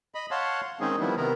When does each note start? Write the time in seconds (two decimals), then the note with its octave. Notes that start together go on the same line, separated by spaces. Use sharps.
0.15 D#5 B5
0.31 C#5 F5 F#5 A5 C6
0.80 D#3 G#3 C4 C#4 D#4 G#4
1.00 D#3 F3 G3 B3 E4
1.17 C3 D#3 B3 A#4